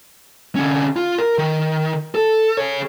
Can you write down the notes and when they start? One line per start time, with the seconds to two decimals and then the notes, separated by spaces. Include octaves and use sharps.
0.56 D3 C#4
0.96 F4
1.18 A#4
1.38 D#3
2.15 A4
2.57 G#4 C#5